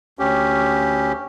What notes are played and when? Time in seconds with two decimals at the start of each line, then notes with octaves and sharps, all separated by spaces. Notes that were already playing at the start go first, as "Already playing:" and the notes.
0.19 D2 C#4 G4